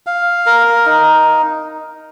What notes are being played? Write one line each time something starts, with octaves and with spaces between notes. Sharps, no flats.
F5
A#4
D#4